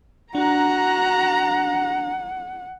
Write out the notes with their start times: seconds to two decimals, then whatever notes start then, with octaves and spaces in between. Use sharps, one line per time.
0.35 D4 F#4 F#5 A#5 F#6